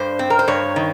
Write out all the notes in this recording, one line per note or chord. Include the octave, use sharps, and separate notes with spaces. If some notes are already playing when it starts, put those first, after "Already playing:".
Already playing: G2 C5
C4
A#4
C5
G2 C#5
D#3